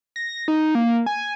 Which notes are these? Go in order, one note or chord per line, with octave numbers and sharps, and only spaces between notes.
A#6
D#4
A#3
G#5